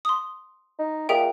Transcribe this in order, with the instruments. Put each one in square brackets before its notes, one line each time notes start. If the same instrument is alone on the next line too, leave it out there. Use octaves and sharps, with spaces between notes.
[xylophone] C6 D#6
[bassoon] D#4
[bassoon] A#2 [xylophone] G#4 E5 G5